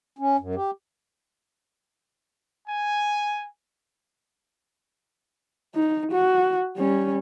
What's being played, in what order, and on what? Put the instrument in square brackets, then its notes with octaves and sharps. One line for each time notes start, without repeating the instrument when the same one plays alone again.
[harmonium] C#4
F#2
G4
[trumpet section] G#5
[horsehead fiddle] D#4
F#4
G3 C#4